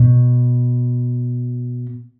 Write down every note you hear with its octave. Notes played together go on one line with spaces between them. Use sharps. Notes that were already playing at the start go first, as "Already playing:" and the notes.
Already playing: B2